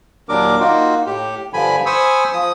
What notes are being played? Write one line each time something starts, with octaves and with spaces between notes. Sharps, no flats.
D#2 A#2 F#3 D4 A#4 D6
A#3 D#4 F4 F#4
A2 G4
G2 D3 F3 G#5 B5
C5 G#5 B5 C#6 D#6 E6
F3 D#6